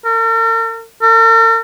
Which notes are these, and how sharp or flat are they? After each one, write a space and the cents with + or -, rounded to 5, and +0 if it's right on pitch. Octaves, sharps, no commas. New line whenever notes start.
A#4 -45
A#4 -45